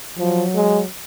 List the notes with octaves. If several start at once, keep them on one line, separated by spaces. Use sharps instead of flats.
F3 F#3
G#3